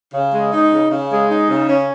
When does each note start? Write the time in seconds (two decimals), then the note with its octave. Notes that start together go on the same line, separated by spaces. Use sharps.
0.14 C#3
0.33 G#3
0.53 D#4
0.72 C#3
0.91 C#3
1.11 G#3
1.29 D#4
1.48 C#3
1.68 C#4